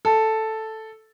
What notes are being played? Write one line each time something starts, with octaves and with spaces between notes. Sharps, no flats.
A4